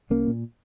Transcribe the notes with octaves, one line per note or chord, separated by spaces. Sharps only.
C2 A#3 C#4
A#2